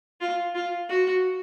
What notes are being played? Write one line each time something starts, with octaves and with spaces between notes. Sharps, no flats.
F4
F4
F#4